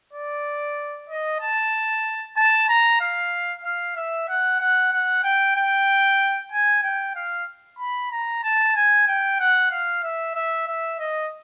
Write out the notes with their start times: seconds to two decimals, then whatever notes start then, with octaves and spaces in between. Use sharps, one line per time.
0.13 D5
1.09 D#5
1.40 A5
2.37 A5
2.68 A#5
3.00 F5
3.64 F5
3.97 E5
4.28 F#5
4.60 F#5
4.92 F#5
5.24 G5
5.56 G5
6.52 G#5
6.83 G5
7.15 F5
7.79 B5
8.12 A#5
8.43 A5
8.76 G#5
9.08 G5
9.40 F#5
9.71 F5
10.03 E5
10.36 E5
10.68 E5
10.99 D#5